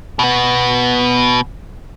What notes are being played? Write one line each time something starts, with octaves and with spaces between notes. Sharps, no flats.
B2 B3